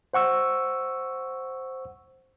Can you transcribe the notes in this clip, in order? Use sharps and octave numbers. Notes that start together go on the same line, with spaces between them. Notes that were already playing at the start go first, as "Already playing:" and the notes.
C5 F#5 C#6 E6